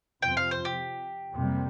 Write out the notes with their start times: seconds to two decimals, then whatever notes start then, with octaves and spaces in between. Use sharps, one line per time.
0.22 F2 C3 F3 C4 G5
0.37 F5
0.51 C5
0.65 G4
1.34 F2 C3 G3 A#3